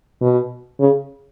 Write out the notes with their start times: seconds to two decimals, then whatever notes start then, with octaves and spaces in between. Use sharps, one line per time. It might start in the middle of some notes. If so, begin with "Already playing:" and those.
0.21 B2
0.80 C#3